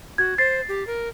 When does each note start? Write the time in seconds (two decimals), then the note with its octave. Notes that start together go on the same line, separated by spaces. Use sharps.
0.18 F#4 G#6
0.38 C5 A6 C7
0.68 G4
0.87 A#4